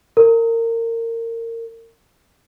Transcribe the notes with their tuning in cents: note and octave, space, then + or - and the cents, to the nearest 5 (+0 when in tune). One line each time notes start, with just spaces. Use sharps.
A#4 -25